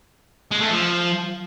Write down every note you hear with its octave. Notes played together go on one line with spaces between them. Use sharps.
G#3
A3
F3